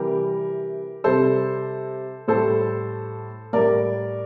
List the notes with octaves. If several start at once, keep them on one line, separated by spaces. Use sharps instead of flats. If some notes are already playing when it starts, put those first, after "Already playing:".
Already playing: C3 E3 G3 G4 A#4
C3 G3 A4 C5
A2 G3 A4 C5
A2 G3 A#4 D5